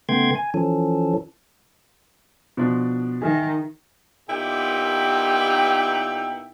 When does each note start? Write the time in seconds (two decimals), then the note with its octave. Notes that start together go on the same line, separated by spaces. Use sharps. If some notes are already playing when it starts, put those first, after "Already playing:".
0.09 C#3 A3 B3 G5 C6 G#6
0.35 G#5
0.54 E3 F3 C#4 A4
2.57 B2 F3 D4
3.22 D#3 G#4 A#4 E5
4.29 A#2 B3 D#4 E4 G4 G5